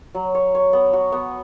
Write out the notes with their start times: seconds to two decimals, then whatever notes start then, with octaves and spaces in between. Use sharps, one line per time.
0.15 F#3
0.35 C#5
0.55 C#5
0.73 B3
0.93 F#4
1.12 B3